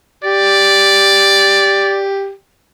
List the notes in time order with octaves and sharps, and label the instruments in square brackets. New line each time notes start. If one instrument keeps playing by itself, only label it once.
[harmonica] G4 [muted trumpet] D5